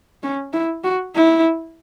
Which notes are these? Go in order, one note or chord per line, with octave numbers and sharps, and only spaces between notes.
C#4
E4
F#4
E4